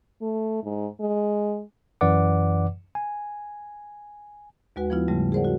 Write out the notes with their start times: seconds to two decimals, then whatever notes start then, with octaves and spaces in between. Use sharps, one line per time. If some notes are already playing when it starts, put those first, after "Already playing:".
0.21 A3
0.63 G#2
1.00 G#3
2.01 F#2 E3 B4 D5 F#5 D6
2.95 G#5
4.76 D#2 G#3 F#4 B4 F#5
4.90 F3 B3 E4 F4
5.08 G#2 C#3 G3 A3
5.32 G#4 A#4 C5 D5 F#5
5.44 F4 F#4